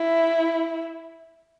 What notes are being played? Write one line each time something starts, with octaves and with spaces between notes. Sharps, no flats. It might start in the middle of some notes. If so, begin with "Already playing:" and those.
Already playing: E4